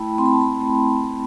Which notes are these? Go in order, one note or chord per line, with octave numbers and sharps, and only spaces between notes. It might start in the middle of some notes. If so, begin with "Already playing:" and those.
Already playing: A3 E4 G5 A5 B5
C4 C6
B5
A5
B5
A3